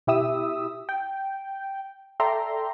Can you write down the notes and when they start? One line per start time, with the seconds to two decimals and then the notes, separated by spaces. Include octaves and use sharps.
0.07 B2 E4 G4 E5 D#6 E6
0.89 G5
2.20 A4 D5 E5 G5 A#5 C6